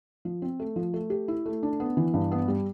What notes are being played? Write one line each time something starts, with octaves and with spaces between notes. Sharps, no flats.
F3
C4
A3
F3
A3
G4
E4
A3
D4
B3
E3
G2
B3
G3